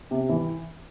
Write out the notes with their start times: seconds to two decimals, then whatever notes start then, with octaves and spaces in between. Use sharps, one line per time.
0.11 C3
0.29 E3